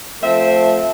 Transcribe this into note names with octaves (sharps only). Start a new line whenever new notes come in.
F3 A3 C4 E5